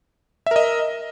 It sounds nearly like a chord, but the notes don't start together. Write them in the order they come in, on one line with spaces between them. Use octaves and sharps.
E5 A#4 D#5